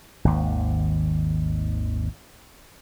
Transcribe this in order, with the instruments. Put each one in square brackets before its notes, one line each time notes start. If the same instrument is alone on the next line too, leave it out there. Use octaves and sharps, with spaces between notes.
[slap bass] G#1 D#2